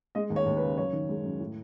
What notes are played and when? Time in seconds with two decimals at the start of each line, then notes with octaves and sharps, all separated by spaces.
0.15 G#3 D#5
0.30 D#2
0.36 C#5
0.46 D#2
0.57 B4
0.62 C#3
0.77 F#2 C#5
0.93 D#3
1.09 G#3
1.24 F#2
1.40 A2